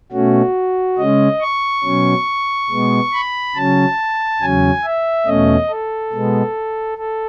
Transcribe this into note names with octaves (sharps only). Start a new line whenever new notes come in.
B2 A3 C#4 F#4
C#3 G#3 C#4 D#5
C#6
B2 F#3 C#4
B2 G#3 B3
B5
C#3 F#3 C#4 A5
E2 C#3 F#3 C#4 G#5
E5
E2 B2 A3 C#4 D#5
A4
B2 G#3 B3
A4